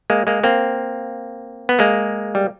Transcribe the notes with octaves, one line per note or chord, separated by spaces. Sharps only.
G#3 A#3
G#3 A#3
A#3 C4
B3
G#3 A#3
G3